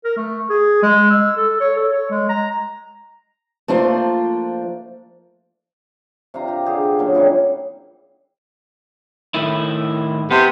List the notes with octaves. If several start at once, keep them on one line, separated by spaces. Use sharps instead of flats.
A#4
A3
G#4
G#3
E6
A4
C#5
A4
C#5
G#3
A#5
F3 A3 A#3 D4 F4 C5
C3 D4 F4 A#5
G4
D3 G4 G#4
F5
A#2 C#3 F#3
E3 G3 C4 C#4
A2 D#3 E4
C3 B3